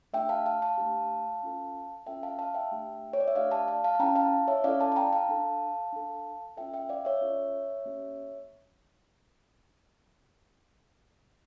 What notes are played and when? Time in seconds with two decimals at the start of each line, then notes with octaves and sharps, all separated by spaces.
0.13 A3 D4 G4 E5 G5
0.29 F5 A5
0.46 F5 A5
0.62 F5 A5
0.78 A3 D4 G4
1.43 C#4 F4 A4
2.06 C#4 F4 A4 E5 G5
2.23 F5 A5
2.39 F5 A5
2.54 E5 G5
2.72 A3 D4 G4
3.13 C#5
3.20 D5
3.28 E5
3.35 A3 D4 G4 D5 F5
3.51 F5 A5
3.68 F5 A5
3.84 F5 A5
3.95 A5
3.99 C#4 E4 A4 G5 A#5
4.15 F5 A5
4.48 C#5 E5
4.64 C#4 E4 A4 D5 F5
4.80 F5 A5
4.92 A5
4.96 G5 A#5
5.13 F5 A5
5.29 D4 A4
5.92 D4 A4
6.57 C#4 F4 A4 E5 G5
6.74 E5 G5
6.89 D5 F5
7.05 C#5 E5
7.21 C#4 F4 A4
7.86 A#3 C#4 G4